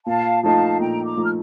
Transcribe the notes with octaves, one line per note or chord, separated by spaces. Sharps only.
A#2 F5 A5
F3 A3 D#4 F5 A5
A#2 G5 A#5
A#5 D6
F3 A3 D#4
F6